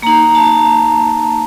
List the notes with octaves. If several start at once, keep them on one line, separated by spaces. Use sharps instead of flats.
A#3 D#4 A#5
A5